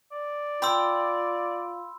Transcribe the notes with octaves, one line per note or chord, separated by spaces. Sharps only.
D5
F4 G5 B5 C6 E6